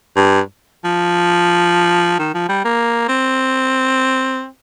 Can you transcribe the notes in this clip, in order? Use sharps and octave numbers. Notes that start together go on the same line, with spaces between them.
G2
F3
D#3
F3
G3
A#3
C4